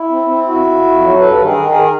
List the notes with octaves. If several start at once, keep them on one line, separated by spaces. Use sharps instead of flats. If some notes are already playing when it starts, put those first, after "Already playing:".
Already playing: E4
C4
C4
F2 E4 F#4
F2
F2
F#3
G2 A4 B4
D#3
G#4 A#4
D#3
G#4 A#4